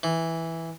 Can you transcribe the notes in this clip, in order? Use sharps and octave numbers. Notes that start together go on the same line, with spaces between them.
E3